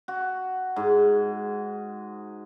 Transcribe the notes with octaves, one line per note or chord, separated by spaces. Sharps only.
F#4
G#2